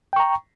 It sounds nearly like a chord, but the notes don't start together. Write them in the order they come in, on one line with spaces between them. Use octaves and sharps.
G5 C#6 A#5